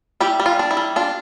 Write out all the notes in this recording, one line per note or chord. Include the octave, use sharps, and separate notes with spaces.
G3 E4 G4
G3
F4
D4
E4
G3
D4 F4